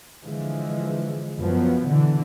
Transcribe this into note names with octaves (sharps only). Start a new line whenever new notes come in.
D3 E3 F3 G#3
F#2 F3 F#3 B3
B2 D3 E3